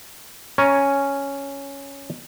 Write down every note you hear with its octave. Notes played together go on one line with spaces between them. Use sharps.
C#4 G#5 A#5